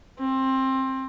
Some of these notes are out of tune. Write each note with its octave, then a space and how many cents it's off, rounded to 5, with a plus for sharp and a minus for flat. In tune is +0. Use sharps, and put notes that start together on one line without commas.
C4 +20